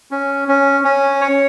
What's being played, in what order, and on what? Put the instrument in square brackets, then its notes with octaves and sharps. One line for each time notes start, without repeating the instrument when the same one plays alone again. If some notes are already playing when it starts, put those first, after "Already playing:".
[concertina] C#4
C#4
C#4
C#5